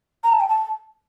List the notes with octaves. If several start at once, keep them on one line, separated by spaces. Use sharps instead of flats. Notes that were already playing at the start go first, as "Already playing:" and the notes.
A#5
A5
G5
A5